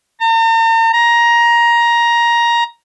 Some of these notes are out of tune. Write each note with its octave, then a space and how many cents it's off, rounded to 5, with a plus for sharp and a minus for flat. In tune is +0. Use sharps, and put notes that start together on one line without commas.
A#5 -45
A#5 +15